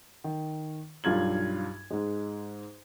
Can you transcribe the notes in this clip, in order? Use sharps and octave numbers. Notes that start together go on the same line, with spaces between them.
D#3
B1 G2 F4 G#6 F#7
G#2 G#3